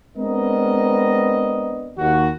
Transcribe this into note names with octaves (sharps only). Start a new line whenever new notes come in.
G#3 B3 C4 D4 A#4 D#5
D#2 D#3 F#4